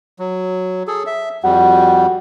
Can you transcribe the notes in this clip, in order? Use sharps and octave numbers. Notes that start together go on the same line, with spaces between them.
F#3
G#4 A4
E5
F2 G3 F#4